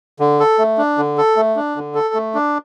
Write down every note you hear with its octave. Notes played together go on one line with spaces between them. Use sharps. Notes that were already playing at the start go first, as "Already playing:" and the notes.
D3
A4
A3
D4
D3
A4
A3
D4
D3
A4
A3
D4